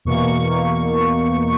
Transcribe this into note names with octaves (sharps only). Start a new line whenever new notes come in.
E2 B2 A#3 C#6
E2 B2 A#3